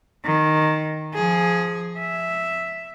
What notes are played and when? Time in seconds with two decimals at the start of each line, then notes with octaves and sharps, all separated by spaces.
0.25 D#3
1.14 F3 G#4
1.99 E5